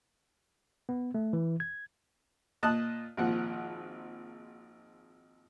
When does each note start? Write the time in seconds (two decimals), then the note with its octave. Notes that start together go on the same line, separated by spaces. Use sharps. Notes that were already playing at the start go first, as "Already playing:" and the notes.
0.89 B3
1.15 A3
1.33 E3
1.60 G#6
2.63 A#2 D#5 A5 D#6 F#6
3.17 G#1 A#2 F3 F#5